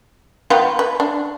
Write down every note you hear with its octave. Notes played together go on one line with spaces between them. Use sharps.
D#3 B3 F4
B4
D4